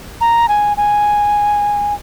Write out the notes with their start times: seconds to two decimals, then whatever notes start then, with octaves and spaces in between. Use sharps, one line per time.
0.21 A#5
0.48 G#5
0.77 G#5